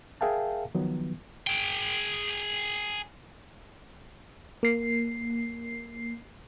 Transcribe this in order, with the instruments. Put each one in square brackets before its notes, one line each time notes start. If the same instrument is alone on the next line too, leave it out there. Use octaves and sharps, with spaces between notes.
[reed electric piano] G#4 A#4 E5 F5 G5 A5
D#3 F3 F#3 B3
[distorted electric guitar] G#4 G5
[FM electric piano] A#3 C7